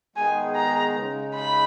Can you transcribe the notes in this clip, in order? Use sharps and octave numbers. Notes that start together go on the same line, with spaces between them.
D#3 G#3 B3 D#4 G#4 G#5
A#5
C#3 G#3 D#4
B5